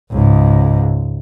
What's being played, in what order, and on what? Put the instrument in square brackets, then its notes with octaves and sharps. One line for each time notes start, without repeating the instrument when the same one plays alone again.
[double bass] C#2 G#2